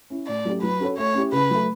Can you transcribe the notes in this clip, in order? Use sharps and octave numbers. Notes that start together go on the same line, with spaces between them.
C#4 E4
A2 D5
F#3 A3 C#4 G4
F#3 B4
C#4 F#4 A4 C#5
A3 C#5
C#4 E4 G4
C#3 B4
F#3 A3